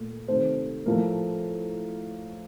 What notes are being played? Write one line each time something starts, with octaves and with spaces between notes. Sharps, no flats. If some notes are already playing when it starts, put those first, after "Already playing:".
Already playing: A#2 A3
C3 D#3 A3 C5
A2 F3 A3 A#4